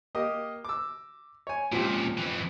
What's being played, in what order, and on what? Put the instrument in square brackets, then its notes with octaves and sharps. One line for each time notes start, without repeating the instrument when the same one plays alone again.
[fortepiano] A#3 G4 D#5
D6 E6
C#5 G#5
[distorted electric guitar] C#2 A#2 [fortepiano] F3 C4 G4
[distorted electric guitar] F2 E3